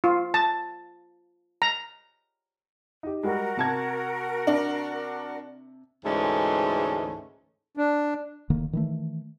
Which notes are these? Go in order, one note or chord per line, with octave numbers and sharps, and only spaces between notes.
F4
A5
A#5
D#4 G4
G3 G#3 F#4 A#4
C3 A5 G#6
D4
D2 G#2 E3 G#3 A3 C#4
D4
D#1 D3 D#3 A#3
D#3 E3 A3